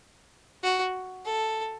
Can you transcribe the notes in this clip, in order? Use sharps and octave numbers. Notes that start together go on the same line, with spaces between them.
F#4
A4